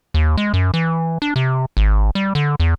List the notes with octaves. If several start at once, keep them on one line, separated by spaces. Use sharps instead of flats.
D#2
G#3
F#2
E3
D4
C3
G#1
G3
D3
E2